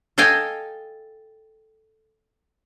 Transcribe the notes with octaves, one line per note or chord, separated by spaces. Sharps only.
A4 D#5 F5 G5 G#5